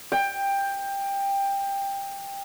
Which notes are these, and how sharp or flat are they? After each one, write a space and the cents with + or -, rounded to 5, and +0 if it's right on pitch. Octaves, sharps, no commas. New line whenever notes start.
G5 +15